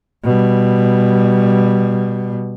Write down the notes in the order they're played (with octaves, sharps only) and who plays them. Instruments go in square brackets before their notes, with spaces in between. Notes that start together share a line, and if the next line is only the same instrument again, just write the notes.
[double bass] B2 G3